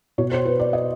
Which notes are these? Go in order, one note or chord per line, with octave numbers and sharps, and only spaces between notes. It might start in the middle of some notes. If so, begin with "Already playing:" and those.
B2 C#5
C5
B4
D5
D#5